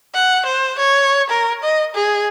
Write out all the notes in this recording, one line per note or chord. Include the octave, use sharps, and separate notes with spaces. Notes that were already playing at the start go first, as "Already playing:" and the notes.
F#5
C5
C#5
A#4
D#5
G#4